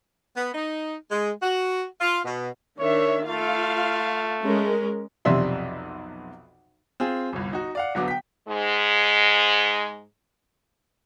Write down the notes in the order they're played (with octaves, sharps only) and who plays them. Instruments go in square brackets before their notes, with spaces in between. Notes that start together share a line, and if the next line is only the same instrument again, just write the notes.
[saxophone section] B3
D#4
G#3
F#4
F4
B2
[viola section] D#3 D4 E5 [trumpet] C#5
[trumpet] A3 [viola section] F4 F5
[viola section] G#3 C#4 A#4
[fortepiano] B1 F2 C3 D5 E5 C6
[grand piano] C4 F4 G#4
G1 C2
D#4 F#4
D5 F5 F#5
D1 D3 F#3 B3 D6
G5 B6
[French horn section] G#2 G#3